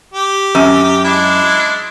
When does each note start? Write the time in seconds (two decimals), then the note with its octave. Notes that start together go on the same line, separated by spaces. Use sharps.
0.14 G4
0.55 F#2
1.04 G#3 D4 E4